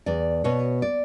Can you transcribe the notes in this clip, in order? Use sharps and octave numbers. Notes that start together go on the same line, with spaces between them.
E2 D5
B2 C#5
D5